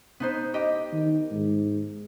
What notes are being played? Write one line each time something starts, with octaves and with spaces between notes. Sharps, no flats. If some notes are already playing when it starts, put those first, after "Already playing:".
B3 D#4 C5
G4 D#5
D#3
G#2